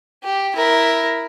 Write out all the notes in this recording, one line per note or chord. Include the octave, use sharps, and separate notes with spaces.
G4
E4 A#4